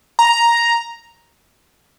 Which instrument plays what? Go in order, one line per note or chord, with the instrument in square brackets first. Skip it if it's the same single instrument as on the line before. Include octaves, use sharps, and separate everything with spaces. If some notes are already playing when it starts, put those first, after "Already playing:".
[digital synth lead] A#5